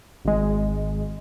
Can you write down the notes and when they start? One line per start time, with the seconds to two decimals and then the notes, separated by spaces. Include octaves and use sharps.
0.25 G#1 G#3